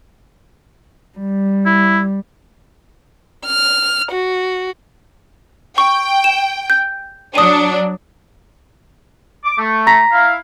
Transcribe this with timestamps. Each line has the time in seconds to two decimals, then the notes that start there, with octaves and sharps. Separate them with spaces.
1.18 G3
1.66 E4
3.46 F6
4.11 F#4
5.78 G5 C#6
6.24 E7
6.70 G6
7.35 F#3 D4 D#6 D#7
9.45 D6
9.59 A3
9.87 A#5 A#6 B6
10.12 E4 F5